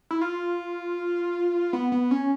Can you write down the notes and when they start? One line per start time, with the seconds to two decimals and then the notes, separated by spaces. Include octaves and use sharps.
0.11 E4
0.21 F4
1.73 B3
1.92 B3
2.11 C#4